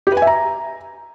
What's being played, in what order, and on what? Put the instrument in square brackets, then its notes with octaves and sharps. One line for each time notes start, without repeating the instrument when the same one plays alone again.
[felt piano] G4
B4
G#5
E5
A#5